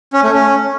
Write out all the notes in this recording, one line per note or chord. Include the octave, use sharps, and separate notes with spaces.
C#4
A3
C#4